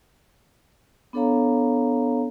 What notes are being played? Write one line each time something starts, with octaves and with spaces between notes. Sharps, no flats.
B3 D4 A4 C#5 F5 A#5